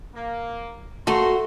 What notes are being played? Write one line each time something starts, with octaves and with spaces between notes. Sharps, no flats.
A#3
A#2 A3 F#4 A#5 C6